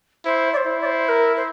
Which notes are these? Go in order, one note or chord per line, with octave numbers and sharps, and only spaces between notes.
E4 C5
D5
C5
E4
D5
C5
A#4
C5